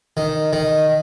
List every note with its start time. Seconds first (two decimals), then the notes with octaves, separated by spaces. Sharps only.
0.17 D#3
0.53 D#3